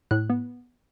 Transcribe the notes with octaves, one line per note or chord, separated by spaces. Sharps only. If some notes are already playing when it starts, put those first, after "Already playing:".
A2 F#6
B3